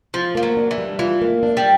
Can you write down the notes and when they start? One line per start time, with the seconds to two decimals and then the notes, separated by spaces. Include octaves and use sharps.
0.14 F3 F4
0.35 F3 A#3
0.43 F#3
0.57 D4
0.71 E3
0.78 G3
0.99 E3 F4
1.21 A#3
1.43 D4
1.57 G3